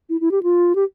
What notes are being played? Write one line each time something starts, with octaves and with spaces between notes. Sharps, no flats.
E4
E4
G4
F4
G4